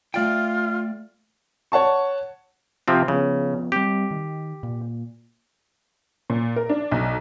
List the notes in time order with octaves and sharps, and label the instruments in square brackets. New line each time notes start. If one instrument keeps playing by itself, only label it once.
[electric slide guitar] A3 D5 G5 [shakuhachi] F4
[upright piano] C#5 F#5 A5 C#6
[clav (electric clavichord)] C3 F3 C4
[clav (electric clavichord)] C#3 [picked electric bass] F3 B3
[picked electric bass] G3 B3 C4 [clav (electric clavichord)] G4
[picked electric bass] D#3
A#2
[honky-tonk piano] A#2
A#4
D4
B1